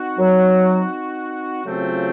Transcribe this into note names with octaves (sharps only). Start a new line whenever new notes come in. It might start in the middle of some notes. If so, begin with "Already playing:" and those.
Already playing: C4 D#4 F#4
F#3
C#3 F#3 A3 C4 F4